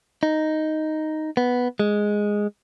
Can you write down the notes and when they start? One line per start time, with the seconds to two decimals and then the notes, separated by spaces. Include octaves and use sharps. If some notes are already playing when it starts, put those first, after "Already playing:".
0.23 D#4
1.37 B3
1.80 G#3